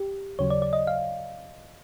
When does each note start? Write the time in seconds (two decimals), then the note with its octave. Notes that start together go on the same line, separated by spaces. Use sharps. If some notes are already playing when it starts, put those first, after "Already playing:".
Already playing: G4
0.39 D#2 C#3 F#3 C#5
0.50 D5
0.62 D5
0.73 D#5
0.87 F5